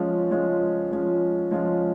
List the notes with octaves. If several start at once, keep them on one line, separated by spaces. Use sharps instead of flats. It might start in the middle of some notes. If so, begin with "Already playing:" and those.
Already playing: F3 G#3 C#4 F4
F3 G#3 C#4 F4
F3 G#3 C#4 F4
F3 G#3 C#4 F4